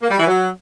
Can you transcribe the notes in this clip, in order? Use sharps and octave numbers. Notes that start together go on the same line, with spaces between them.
A#3
G3
E3
F#3